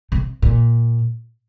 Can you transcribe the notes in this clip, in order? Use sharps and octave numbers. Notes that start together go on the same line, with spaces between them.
C3
A#2